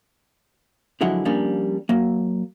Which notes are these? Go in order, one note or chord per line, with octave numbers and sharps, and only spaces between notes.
D3 F3 F#3 G#3 E4 F#5
F3 G3 A#3 C#4 D4
F#3 A#3